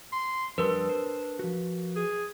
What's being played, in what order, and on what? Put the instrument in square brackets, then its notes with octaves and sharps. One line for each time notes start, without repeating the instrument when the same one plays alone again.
[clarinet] C6
[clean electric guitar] F2 G3 C6 [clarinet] D4 [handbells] A#4 B4
[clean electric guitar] C5
F3 F#4
[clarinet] G#4